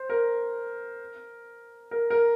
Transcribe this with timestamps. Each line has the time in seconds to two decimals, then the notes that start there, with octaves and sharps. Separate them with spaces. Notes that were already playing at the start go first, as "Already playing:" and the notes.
Already playing: C5
0.10 A#4
1.91 A#4
2.10 A#4